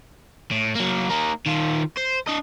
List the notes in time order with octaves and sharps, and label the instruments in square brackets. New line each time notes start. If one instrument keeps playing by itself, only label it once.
[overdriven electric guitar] A2
F#3 A#3
A#3 D#4
D#3 F4
C5
D4 D#5